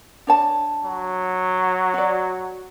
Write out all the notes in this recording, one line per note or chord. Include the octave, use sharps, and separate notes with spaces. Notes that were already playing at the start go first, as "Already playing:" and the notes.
D4 C#5 A5
F#3
F#4 D5